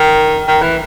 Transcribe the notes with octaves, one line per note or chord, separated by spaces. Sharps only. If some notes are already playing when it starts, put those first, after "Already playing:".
Already playing: D#3
D#3
E3